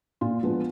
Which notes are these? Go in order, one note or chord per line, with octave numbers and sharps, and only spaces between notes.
A#2 F4
F3 G#3 B3 D4